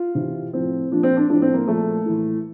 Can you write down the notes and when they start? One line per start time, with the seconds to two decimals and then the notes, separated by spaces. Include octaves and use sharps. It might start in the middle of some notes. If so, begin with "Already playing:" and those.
Already playing: F4
0.15 C3 E3
0.53 A2 F3 C4
0.91 A#2 F3 D4
1.03 C4
1.17 D4
1.29 A2 F3 D4
1.42 C4
1.54 A#3
1.67 A#2 F3 A3
2.05 A2 E3